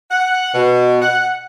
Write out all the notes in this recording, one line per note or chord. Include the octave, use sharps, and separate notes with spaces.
F#5
B2
F#5